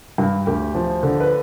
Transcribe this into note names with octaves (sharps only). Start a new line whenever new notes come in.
G2
D2 G4
F3
D3
B4